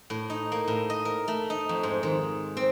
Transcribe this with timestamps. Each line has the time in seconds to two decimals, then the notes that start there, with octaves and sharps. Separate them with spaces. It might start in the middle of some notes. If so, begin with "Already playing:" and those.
0.10 A2
0.30 D#4
0.52 A#3
0.68 A2
0.90 D#5
1.05 A#4
1.28 A3
1.50 D#4
1.69 F2
1.83 G#2
2.03 D#3
2.57 C4